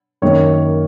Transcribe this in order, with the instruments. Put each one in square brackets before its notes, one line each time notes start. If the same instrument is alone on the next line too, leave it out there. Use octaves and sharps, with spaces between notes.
[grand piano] F#2 D#3 A#3 C#5